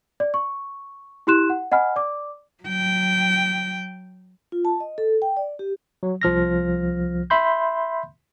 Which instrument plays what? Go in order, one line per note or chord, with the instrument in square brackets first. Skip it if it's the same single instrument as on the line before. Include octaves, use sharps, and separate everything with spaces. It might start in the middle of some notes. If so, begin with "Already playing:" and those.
[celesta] D5
C#6
E4 G4 C6 F#6 E7
F#5
D#5 F#5 G#5 B5 F6
D5 D6
[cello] F#3 G5
[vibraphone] F4
A5
D#5
A4
G5
D5
G4
[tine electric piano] F#3
C2 F3 F6 A#6
E5 B5 C6 G6